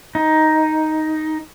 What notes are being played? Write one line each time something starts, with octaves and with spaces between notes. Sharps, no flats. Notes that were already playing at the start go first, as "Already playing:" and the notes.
D#4